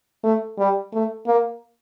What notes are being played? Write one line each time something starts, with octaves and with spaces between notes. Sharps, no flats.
A3
G3
A3
A#3